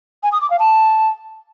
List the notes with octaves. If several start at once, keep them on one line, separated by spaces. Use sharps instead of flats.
G#5
D#6
D6
F5
A5